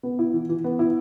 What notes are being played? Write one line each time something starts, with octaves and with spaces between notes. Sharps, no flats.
B3
E4
E3
E3
B3
E4